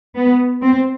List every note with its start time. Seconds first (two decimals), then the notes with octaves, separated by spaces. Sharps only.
0.17 B3
0.62 C4